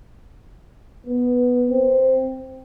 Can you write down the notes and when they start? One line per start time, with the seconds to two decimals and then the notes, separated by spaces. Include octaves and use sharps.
1.07 B3
1.70 C4